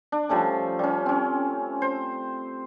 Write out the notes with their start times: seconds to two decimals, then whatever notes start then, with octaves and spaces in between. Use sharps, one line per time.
0.12 D4
0.29 F3 G3 A3 C#4
0.79 G3 C#4
1.06 C4 C#4
1.82 C5